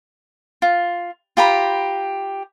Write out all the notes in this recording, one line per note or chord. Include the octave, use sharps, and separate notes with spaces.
F4
F4 G4 A#5 B5